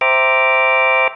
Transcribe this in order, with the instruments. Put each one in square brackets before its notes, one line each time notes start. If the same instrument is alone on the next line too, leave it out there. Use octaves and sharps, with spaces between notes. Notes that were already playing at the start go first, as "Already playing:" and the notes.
[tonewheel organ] C5 E5 G5 A#5 D6